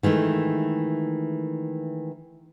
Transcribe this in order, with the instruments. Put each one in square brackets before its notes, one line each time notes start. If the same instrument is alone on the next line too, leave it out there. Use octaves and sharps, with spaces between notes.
[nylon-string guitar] D#3 E3 G#3 A3